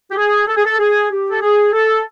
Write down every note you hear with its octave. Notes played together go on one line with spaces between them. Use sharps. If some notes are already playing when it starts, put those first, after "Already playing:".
G4
G#4
A4
G#4
A4
G#4
G4
A4
G#4
A4